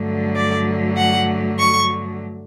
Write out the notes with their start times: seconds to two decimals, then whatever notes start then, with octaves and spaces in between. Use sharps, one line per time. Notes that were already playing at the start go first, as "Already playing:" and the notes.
Already playing: G2 D3 F#3 A3
0.35 D5
0.97 F#5
1.58 C#6